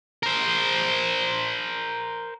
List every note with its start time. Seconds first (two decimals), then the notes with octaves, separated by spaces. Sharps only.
0.23 A#4 C5